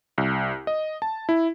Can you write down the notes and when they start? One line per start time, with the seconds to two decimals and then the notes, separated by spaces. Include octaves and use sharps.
0.18 C2
0.67 D#5
1.02 A5
1.29 E4